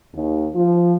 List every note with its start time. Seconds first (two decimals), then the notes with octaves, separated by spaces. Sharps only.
0.13 D#2
0.54 F3